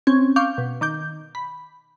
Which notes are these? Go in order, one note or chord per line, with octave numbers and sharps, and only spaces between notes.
C4 C#4
F5 C#6 D6 G6
B2
D#3 D6 G6
B5